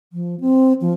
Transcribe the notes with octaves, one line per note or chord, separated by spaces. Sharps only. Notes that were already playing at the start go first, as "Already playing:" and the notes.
F3
C4
F3